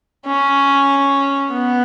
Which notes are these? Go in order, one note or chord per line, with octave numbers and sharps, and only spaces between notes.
C#4
B3